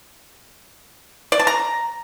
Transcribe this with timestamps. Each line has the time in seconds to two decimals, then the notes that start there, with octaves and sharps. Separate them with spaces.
1.32 D5
1.39 A5
1.47 A#5